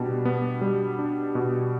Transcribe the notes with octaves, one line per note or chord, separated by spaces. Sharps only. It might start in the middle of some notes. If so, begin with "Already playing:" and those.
Already playing: B2 G3 D4
B3
G3
D4
B2